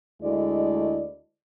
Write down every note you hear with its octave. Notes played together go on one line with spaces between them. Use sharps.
D2 G#3 A3 E4 D5 D#5